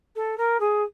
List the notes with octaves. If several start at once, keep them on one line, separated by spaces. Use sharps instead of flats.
A4
A#4
G#4